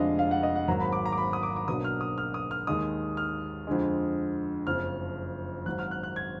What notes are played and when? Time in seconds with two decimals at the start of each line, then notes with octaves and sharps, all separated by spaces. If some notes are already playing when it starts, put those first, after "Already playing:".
Already playing: F1 F2 D3 G#3 D4 D#5 F5
0.19 F5
0.31 F#5
0.43 D#5
0.56 F#5
0.68 G#1 G#2 F#3 A#3 A#5
0.80 B5
0.92 D6
1.06 A#5
1.12 D6
1.18 B5
1.33 D#6
1.43 D6
1.56 D6
1.68 B1 B2 F#3 A#3 D4 D#6
1.84 F6
2.01 D#6
2.18 F6
2.34 D#6
2.51 F6
2.67 D#2 D#3 G#3 D#6
3.17 F6
3.67 F2 D3 G#3
4.66 F#1 F2 F3 F6
5.66 G#1 G#2 F#3 F#6
5.79 F6
5.91 F#6
6.03 F#6
6.16 G#6